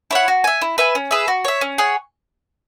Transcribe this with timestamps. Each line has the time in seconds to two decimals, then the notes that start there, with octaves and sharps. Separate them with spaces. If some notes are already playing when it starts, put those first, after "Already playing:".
0.11 E4 C#5 F#5
0.28 F#4
0.44 E5 G#5
0.62 E4
0.78 B4 E5 G#5
0.95 C#4
1.11 G#4 B4 E5
1.28 F#4
1.45 C#5 E5
1.61 C#4
1.78 G#4 C#5 F#5